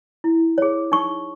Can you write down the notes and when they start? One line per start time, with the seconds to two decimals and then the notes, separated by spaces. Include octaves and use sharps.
0.24 E4
0.58 G#4 C#5
0.92 D#4 C#6